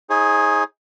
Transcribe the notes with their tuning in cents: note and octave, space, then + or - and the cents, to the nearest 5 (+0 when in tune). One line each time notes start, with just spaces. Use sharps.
D#4 +35 G#4 +0 C#5 -40